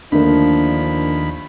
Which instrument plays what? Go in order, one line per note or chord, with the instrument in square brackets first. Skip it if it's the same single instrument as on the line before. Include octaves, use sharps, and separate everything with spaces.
[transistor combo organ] D#2 B5 [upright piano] D3 A3 A#3 [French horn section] F3 D4